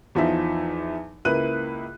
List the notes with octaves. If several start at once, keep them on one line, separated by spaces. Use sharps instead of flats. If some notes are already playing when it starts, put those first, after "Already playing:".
E2 F3 D#4 E5
C#2 A#3 E4 B4 F#6 D#7